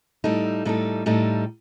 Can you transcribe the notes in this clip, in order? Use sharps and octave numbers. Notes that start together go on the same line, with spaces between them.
A2 G3 D#4 A4
A2 G3 D#4 A4
A2 G3 D#4 A4